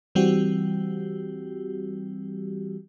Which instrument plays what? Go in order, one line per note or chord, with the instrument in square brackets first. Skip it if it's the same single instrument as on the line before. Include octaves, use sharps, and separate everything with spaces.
[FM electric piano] E3 G3 C4 F#4 G4